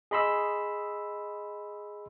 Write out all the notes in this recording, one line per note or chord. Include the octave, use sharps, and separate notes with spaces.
G#4 D#5 B5 C6 E6